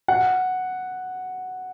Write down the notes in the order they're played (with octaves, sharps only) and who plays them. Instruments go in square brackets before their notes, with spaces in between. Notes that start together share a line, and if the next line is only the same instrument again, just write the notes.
[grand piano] F#5